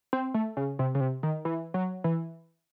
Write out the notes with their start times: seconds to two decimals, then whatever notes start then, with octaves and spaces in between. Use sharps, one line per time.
0.13 C4
0.34 A3
0.57 C#3
0.79 C3
0.95 C#3
1.01 C3
1.23 D#3
1.45 E3
1.74 F#3
2.04 E3